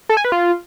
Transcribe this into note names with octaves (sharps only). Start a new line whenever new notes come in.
A4
G#5
B4
F4